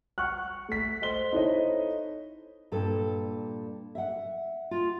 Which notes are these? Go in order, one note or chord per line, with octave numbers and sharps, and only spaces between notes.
F#5 C#6 F6 F#6
A3 B6
C5 D#5 C6 G7
D#4 E4 A4 C5 C#5 D#5
G2 A#2 A4
E5 F#5
F4